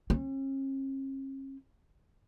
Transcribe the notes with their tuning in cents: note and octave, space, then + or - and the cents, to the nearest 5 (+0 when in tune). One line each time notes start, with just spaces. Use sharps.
C#4 -45